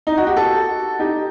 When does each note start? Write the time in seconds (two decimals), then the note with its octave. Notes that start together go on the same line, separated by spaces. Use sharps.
0.07 D#4
0.17 F#4
0.27 G4
0.36 F#4 A4
0.99 D#4 G4